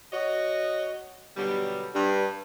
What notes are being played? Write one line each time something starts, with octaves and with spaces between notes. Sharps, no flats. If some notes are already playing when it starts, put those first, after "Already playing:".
F#4 C#5 D#5
B2 D3 F#3 G3
G2